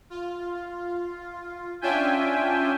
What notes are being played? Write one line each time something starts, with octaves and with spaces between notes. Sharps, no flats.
F4
C#4 D4 F4 E5 G5 G#5